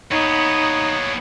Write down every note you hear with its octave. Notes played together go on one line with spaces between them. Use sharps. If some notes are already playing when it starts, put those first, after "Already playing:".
D#2 B3 D#4 C#5